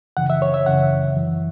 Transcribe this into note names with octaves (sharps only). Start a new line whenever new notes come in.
F#2 C#3 E3 F#5
E5
C#5
E5
F#2 C#3 E3 F#5
F#2 E3